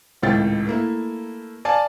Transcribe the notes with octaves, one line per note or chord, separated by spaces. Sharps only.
G#1 C#2 A2 G5 A6
A3 A#3 E4
D5 F5 G#5 A5